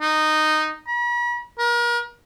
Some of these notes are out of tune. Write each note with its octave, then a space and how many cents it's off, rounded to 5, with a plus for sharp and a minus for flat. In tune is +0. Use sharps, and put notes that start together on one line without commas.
D#4 -10
B5 -45
A#4 +40